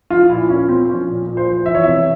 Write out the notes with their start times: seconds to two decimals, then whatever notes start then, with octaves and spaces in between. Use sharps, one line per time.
0.10 F3 F4
0.29 A#2 E4
0.49 A#2 C#4
0.68 F3 C4
0.88 F3 C#4
1.07 A#2
1.26 A#2
1.37 C5
1.46 F3
1.66 E3 E5
1.75 C#5
1.83 C3 E5